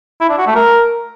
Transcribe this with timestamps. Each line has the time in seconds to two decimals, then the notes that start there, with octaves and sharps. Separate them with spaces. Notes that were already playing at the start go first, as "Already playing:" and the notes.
0.21 E4
0.29 D4
0.38 F#4
0.47 A3
0.55 A#4